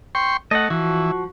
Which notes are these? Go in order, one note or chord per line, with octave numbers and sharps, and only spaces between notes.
G5 C6 C#6
A3 D#5 F#5
E3 F3 F#4